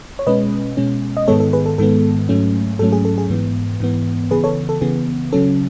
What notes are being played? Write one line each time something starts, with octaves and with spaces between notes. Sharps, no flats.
C#5
B2 G#3 C#4 B4 D#5
B2 G#3 C#4
D#5
G#2 D#3 G#3 B3 A4 C#5
A4
G#4 B4
A4
G#2 D#3 G#3 B3 A4
G#2 F#3 A3 C#4
G#2 F#3 A3 C#4 A4
G#4
A4
G#4
G#2 E3 B3
G#2 E3 B3
C#3 E3 B3 G#4 B4
A4 C#5
A4
C#3 E3 B3 G#4
C#3 F#3 C#4 A4